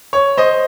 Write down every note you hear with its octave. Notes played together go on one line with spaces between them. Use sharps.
C#5
C5 D#5